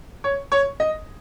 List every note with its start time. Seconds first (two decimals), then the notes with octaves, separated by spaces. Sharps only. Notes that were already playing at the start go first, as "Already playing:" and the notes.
0.24 C#5
0.52 C#5
0.80 D#5